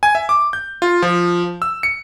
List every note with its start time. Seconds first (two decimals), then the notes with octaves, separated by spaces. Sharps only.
0.03 G#5
0.15 E5
0.29 D6
0.53 G6
0.82 F4
1.02 F3
1.62 E6
1.83 C#7